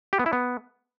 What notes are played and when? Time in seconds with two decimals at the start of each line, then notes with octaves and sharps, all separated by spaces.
0.13 G4
0.19 B3
0.26 E4
0.33 B3